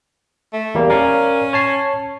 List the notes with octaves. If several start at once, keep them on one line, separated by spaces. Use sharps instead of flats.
A3
E2 G3 A#3
C#4 A#4 D5 F5
C#5 A5 C7